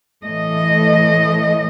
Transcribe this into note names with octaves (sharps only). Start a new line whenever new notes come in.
A2 E3 A3 D#5